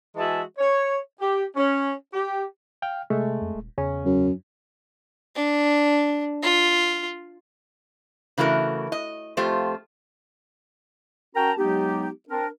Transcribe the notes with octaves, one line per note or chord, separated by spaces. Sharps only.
E3 G#3 F#4 G#4 E5 A5
C#5
G4
C#4
G4
F5 G5 F6
C3 G#3 A3
F2
D#1
E2 C#3 C#4
F#2
D4
F4
C#3 E3 A3 F#4 A#4
D#5
F2 A3 F4 G4 C5
C#4 F#4 A#4 G5 A5 A#5
F#3 G#3 B3 D#4 G4
C4 D4 A#4